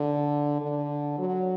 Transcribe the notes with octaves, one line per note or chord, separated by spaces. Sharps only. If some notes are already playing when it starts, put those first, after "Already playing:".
Already playing: D3
D3
F#3